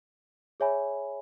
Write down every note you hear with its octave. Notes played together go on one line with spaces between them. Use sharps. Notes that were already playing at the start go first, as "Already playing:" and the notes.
G#4 C#5 E5 G#5 B5